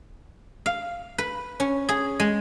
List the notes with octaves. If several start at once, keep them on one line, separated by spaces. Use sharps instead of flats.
F5
B4
C#4
G#4
G#3